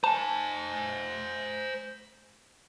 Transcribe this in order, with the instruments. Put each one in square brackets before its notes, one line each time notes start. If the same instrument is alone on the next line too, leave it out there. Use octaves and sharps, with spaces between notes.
[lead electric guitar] C5 G#5 [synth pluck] A5